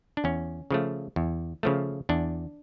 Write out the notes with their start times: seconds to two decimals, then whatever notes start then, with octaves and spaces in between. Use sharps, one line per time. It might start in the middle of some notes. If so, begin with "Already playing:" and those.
0.17 D4
0.24 E2 C#4
0.71 C#3 F3 A3
1.16 E2
1.63 C#3 F3 A3
2.09 E2 D4